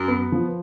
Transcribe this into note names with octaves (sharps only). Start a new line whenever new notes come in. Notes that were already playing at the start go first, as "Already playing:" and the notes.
Already playing: F#2
B3
F3